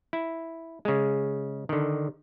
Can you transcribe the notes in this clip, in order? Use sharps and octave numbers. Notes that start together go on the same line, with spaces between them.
E4
C#3 G#3
D3 D#3